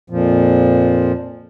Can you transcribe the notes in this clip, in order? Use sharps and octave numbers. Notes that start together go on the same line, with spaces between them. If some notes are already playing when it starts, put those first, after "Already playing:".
F2 A#2 F3